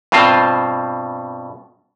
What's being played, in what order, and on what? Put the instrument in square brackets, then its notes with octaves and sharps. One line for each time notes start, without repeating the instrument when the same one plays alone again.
[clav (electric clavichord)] G2 B2 C4 F4 C5